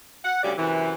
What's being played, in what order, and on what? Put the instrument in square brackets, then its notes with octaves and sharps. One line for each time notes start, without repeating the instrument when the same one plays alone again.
[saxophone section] F#5
D2 C#3 G3 G#4 D5
F#2 C3 E3